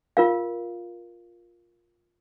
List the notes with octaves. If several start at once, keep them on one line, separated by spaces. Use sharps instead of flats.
F4 A#4 F5